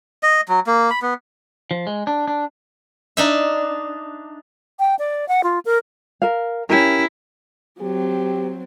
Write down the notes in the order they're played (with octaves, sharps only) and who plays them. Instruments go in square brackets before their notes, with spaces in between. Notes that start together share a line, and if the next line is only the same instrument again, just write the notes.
[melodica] D#5
F#3
A#3
B5
B3
[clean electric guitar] F3
G#3
D4
D4
[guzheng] D4 D#4 E5
[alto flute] G5
D5
F#5
F4
A#4
[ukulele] A#4 F5
[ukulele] C#4 G4 A#4 [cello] E4
[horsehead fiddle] F#3 C4 [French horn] G4